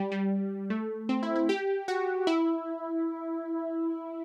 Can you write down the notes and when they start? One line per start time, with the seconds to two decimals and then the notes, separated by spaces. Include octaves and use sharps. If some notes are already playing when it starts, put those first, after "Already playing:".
Already playing: G3
0.12 G3
0.70 A3
1.09 C4
1.23 E4
1.36 E4
1.49 G4
1.88 F#4
2.27 E4